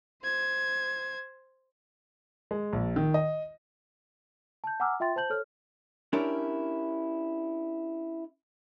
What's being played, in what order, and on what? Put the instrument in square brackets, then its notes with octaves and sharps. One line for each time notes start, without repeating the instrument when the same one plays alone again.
[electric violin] C5 G#6
[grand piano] G#3
A#1
D#3
D#5
[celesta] A5 G6
F#5 G#5 A#5 D6 E6 F6
F4 E5 G5 C6 A6
C5 A5 G6 F#7
A4 C#5 F6
[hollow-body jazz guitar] C#4 D4 E4 G4 A#4